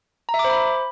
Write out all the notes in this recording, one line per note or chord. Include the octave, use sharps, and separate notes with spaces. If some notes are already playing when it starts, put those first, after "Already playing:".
A#5
E5
D6
C5
B5